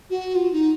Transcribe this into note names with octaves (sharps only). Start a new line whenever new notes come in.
F#4
F4
D#4